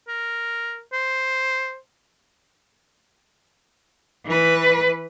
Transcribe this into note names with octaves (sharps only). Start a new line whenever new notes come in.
A#4
C5
E3 B4